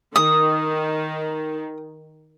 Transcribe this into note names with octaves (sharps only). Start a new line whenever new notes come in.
D#3 D#6